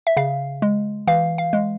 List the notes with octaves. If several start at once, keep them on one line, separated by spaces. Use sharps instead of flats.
E5
C#3 F5
G#3
E3 F5
F5
G#3